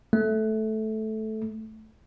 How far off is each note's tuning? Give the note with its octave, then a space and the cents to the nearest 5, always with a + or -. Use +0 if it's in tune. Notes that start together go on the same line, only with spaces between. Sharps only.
A3 -10